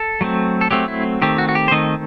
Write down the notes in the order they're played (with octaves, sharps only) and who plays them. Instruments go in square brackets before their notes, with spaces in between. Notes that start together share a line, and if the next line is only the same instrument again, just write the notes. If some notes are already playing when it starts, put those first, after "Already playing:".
Already playing: [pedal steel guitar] A4
F#3 A3 C4
A4
F#3 A3 C4 G4
E4
D#3 A3 C4 G4
F#4
F#4
G4
C5
D#3 A3 C4 D#5